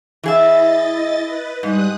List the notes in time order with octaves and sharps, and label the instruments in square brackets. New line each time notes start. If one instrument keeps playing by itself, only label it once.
[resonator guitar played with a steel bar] E3 G#4 E5 [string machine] E4 D#5 A6
[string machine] B4
[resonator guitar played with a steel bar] G#2 [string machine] G3 D#6 F#6